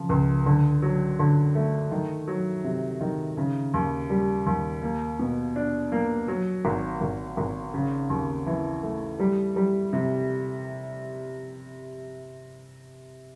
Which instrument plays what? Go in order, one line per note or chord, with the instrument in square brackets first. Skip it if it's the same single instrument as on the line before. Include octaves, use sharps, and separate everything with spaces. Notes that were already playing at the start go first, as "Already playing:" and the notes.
Already playing: [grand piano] C#3 F3
C#2
D3
F#3
D3
A3
D#3
F#3
C3
D#3
C#3
D#2
G3
D#2
A#3
B2
D4
A#3
F#3
G#1
G#1
G#1
C#3
D#2
E3
A3
G3
G3
C3